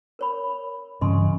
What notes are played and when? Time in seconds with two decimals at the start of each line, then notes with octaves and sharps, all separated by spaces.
0.19 A#4 C#5 B5
1.01 G2 C#3 E3 D#5 C6